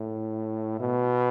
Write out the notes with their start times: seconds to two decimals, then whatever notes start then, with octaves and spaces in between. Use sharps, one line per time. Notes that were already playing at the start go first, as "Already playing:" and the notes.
Already playing: A2
0.80 B2